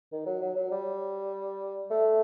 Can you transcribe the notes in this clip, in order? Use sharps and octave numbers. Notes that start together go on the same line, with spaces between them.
D#3
F#3
F#3
F#3
G3
A3